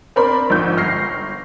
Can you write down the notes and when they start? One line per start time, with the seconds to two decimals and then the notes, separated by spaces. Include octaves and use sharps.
0.16 C4 A#4 D5 B5 C6
0.50 A#1 G#2 G6
0.77 G1 F6 A#6 C7